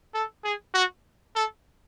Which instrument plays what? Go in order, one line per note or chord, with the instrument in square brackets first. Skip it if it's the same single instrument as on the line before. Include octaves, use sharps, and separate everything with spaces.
[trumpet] A4
G#4
F#4
A4